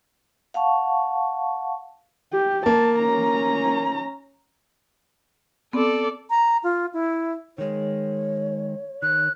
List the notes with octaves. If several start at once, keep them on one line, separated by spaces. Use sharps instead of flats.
F5 F#5 A5 C#6
G4
A#3 A5
C#4 A#5
B3 C4 A4 D5
A#5
F4
E4
D#3 G#3 C#5
D#3 F#6